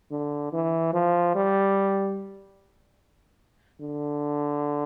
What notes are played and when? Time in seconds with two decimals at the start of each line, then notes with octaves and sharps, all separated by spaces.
0.11 D3
0.53 E3
0.93 F3
1.35 G3
3.81 D3